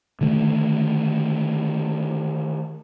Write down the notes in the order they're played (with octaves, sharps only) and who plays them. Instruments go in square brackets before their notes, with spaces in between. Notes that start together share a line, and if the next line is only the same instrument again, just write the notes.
[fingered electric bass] D3 D#3 A3